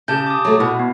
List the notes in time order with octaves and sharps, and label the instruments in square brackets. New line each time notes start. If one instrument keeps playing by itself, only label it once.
[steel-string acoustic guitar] C#3 [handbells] G4 A5 G6
[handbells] D6 D#6
[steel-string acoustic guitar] F#3 A3
[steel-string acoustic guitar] B2 [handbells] E4
[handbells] B3